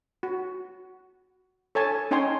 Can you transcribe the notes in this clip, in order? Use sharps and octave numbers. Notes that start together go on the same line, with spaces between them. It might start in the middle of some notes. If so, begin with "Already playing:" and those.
F#4
A4 C#5 G#5 A5
C#4 D#4 C#5 G5 G#5 C6